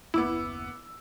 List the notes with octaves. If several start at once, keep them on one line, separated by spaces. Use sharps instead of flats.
F#1 D#2 B3 E4 D6 E6